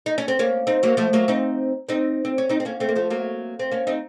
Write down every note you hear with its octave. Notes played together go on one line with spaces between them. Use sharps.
D#4
C#4
C4
A#3 C#4
C4 D#4
F#3 A#3
F3 A3
F#3 A#3
C4 D#4
C4 D#4
C4
C#4
C4 D#4
C4
A#3 C#4
A3 C4
A#3
F3 A3
F#3 A#3
C4
A#3 C#4
C4 D#4